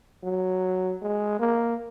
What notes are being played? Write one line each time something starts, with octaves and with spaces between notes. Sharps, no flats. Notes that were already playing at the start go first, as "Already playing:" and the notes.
F#3
G#3
A#3